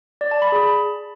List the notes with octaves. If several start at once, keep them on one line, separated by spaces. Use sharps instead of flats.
D5
A5
B5
G#4